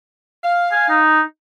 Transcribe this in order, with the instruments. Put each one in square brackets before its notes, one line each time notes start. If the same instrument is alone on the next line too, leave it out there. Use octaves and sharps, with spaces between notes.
[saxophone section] F5
[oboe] G#5
D#4